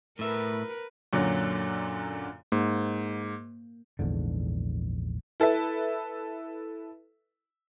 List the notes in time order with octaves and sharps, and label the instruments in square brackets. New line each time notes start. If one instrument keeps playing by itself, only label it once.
[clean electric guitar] A2 E5 [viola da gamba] A#4 B4
[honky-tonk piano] F#2 A#2 D3 F#3
[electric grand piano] G#2 [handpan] A#3
[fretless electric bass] A#1 E2 G#2 D3
[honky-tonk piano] E4 A4 B4 E5